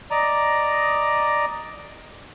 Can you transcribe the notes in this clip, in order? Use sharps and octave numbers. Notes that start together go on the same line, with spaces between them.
D5 D#5 A#5